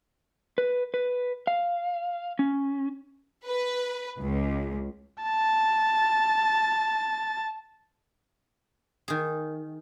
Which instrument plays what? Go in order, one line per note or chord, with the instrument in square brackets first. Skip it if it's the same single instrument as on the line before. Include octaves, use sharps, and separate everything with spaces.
[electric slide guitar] B4
B4
F5
C#4
[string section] B4
C#2
[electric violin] A5 A6
[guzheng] D#3 G#4